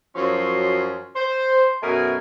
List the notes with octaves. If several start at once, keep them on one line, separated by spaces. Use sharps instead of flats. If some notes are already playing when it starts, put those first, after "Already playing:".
F#2 F3 F#3 C#4 C6
C5
F#2 B2 A3 A#4 E5 G#5